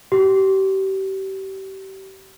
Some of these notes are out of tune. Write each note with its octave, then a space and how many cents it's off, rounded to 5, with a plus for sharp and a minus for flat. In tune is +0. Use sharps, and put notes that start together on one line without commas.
G4 -30